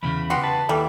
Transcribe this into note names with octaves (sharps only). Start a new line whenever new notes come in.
E2 A2 C#3 B5
G3 B3 F#4 C6
B4 A5
D#2 E3 G3 A4